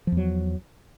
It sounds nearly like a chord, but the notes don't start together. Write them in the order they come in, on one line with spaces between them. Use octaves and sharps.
F3 E2 F#3